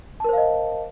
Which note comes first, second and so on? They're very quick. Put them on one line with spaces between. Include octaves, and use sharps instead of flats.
A5 A#4 C5 F5 D#5